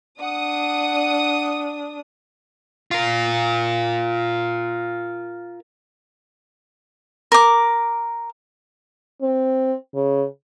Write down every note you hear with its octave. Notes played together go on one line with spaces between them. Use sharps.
D4 F#5 D#6
F4 A#4
A#4 D6
C4
C#3